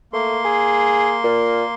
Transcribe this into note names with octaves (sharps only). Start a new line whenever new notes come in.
A3 A#3 C6
G#4
A#2